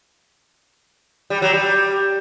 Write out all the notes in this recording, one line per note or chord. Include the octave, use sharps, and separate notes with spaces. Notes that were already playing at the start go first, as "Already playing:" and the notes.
G3
F#3
G3